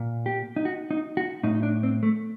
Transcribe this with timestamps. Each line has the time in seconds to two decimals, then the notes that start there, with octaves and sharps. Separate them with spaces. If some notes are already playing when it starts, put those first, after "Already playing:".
Already playing: A#2
0.26 G4
0.56 D#4
0.65 F#4
0.91 D#4
1.17 F#4
1.43 A2 D#4
1.55 D#4
1.63 D4
1.83 C4
2.03 A3